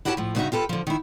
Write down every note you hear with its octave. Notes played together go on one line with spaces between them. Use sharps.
E4 F#4 G4 C#5 G5 A5
A2 F3
G2 C#3 B3 D#4 F#4 E5
F4 G4 A4 B4
D3 F3
D#3 E4